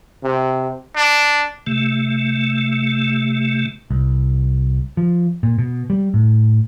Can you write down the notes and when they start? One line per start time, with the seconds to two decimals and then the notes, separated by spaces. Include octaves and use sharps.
0.24 C3
0.96 D4
1.67 C3 A3
3.91 C2
4.97 F3
5.43 A#2
5.58 B2
5.90 G3
6.14 A2